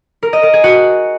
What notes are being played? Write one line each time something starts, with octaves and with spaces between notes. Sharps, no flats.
A#4
D#5
A#4
G#4
F#4